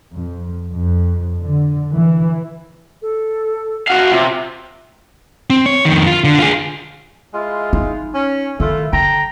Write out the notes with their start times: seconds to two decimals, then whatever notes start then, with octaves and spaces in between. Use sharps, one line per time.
0.17 F2
0.74 F2
1.40 D3
1.93 E3
3.02 A4
3.88 F#4 F5 F#5
4.11 C3 F4
5.50 C4
5.66 C#5
5.85 F2 D#3
6.07 F4
6.24 D3
6.39 F4 G#4
7.34 G#3 E4 F4
7.73 D#4
8.14 C#4
8.60 D#3 A3 E4 F4
8.93 D3 G5 A5 A#5